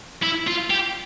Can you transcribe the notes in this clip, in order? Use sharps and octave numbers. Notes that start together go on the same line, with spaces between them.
E4
F4
G4